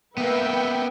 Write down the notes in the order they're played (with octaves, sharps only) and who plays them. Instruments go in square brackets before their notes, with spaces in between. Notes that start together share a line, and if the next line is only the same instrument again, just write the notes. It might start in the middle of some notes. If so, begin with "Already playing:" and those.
[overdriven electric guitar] A#3 B3 [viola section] B4 E5 G5